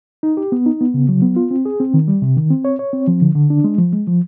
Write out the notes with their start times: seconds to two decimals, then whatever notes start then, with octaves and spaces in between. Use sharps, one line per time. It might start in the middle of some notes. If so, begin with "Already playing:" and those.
0.23 D#4
0.37 G4
0.52 B3
0.66 D#4
0.81 B3
0.94 C#3
1.09 F#3
1.22 B3
1.36 F4
1.51 C4
1.66 G#4
1.80 C4
1.94 D#3
2.08 G3
2.22 C3
2.37 D#3
2.50 C4
2.65 C#5
2.79 C#5
2.93 C4
3.08 F3
3.22 D3
3.35 D3
3.50 D4
3.64 G#3
3.78 F3
3.93 G#3
4.07 F3